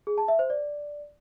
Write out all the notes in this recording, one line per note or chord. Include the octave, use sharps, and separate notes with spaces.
G#4
A5
E5
C5
D5